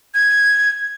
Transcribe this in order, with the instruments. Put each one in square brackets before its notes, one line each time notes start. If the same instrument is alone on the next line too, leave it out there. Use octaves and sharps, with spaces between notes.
[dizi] G#6